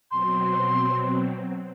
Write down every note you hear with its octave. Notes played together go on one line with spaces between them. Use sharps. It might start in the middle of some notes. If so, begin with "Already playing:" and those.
B2 F#3 C4 C6